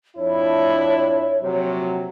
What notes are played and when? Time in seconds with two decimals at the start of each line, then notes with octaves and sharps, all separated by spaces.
0.17 F2 D4 E4 C#5
1.42 A#1 C3 F#3